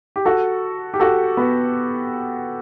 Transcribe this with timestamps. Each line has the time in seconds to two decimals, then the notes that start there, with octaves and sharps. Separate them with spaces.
0.16 G4
0.25 F#4 A4
0.94 G4
1.00 F#4 A4
1.37 B3